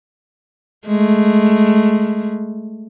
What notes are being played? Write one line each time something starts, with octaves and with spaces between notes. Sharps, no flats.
G#3 A3